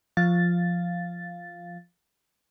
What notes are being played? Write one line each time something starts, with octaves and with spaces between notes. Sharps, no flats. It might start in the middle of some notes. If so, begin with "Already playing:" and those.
F3 F5 A6